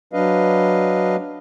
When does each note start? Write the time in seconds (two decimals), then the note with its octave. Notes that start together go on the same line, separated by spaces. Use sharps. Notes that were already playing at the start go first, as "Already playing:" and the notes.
0.13 F#3 D4 B4 D#5 F5